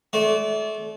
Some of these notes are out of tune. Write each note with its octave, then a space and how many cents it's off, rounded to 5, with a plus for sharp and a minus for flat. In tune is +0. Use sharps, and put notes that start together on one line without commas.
A3 -30 D5 -35